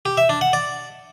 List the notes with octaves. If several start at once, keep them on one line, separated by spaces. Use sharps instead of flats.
G4
E5
D4
F#5
D5